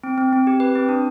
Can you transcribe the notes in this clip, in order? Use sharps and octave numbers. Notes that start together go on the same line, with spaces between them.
C4
C4
C4
G4
B4
C4
D4